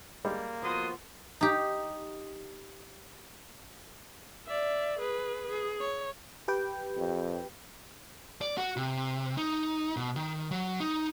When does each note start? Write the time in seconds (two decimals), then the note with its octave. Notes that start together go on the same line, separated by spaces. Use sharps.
0.25 G3 G#3 A#3
0.62 F3 B3 F#4 C6 D#6
1.41 D#4 G4
4.47 D5 E5
4.99 G#4 B4
5.49 G#4
5.80 C#5
6.48 G4 B4 G5
6.97 F2
8.41 D5
8.58 F#4
8.77 C3
9.37 D#4
9.97 B2
10.16 D#3
10.51 F#3
10.80 D#4